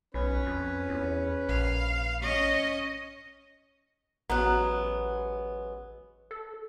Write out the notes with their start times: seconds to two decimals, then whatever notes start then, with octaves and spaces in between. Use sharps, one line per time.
0.14 B1 C#4 B4
0.46 F2
0.89 E2
1.49 A#1 F5
2.22 C#4 D#5
4.30 A1 F#3 G#3 B3 A#5 F#6
6.31 A4